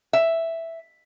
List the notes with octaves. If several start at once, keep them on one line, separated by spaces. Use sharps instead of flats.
E5